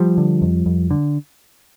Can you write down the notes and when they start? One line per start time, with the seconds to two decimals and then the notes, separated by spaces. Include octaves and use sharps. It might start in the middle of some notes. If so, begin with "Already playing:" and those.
Already playing: F3 G3
0.18 D3
0.42 F2
0.66 F2
0.91 D3